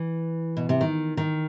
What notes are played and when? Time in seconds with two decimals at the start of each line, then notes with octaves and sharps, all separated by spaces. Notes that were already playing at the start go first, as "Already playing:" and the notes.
Already playing: E3
0.57 B2
0.69 C3
0.81 D#3
1.17 D#3